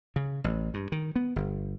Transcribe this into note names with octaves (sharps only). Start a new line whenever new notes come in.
C#3
A1
G2
D#3
B3
G1